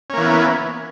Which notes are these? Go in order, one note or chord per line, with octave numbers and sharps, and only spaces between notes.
E3 A#3 B3 C#4